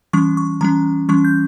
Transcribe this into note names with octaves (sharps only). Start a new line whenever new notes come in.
E3 G3 C#4 C#6
C#6
E3 G3 C#4 A#5
E3 G3 C#4 C#6
G6